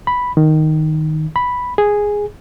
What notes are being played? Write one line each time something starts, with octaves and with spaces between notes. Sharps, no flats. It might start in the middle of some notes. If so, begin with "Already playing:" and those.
B5
D#3
B5
G#4